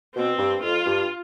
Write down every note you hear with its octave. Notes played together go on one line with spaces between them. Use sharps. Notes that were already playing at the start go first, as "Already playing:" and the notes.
B2 C4
G2
F2 F4
G2